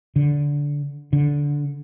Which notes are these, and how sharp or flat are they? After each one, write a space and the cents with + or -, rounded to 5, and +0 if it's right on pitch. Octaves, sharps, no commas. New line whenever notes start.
D3 -15
D3 -15